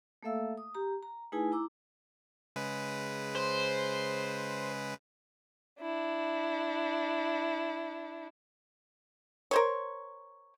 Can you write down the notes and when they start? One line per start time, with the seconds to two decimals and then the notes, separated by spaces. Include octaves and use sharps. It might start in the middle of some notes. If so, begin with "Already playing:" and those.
0.23 A3 A#3 A4 E5 F5 E6
0.58 D#6
0.75 G4 A#5
1.03 A#5
1.32 A3 D#4 E4 G#4 B4 G#5
1.52 E4 A#5 D6 E6
2.56 C#3 G#3 B4
3.35 C5
5.81 D4 E4
9.51 A#4 C5 C#5